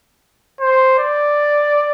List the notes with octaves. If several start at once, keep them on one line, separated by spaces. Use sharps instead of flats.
C5
D5